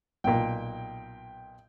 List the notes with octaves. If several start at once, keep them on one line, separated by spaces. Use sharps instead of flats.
B1 A#2 G5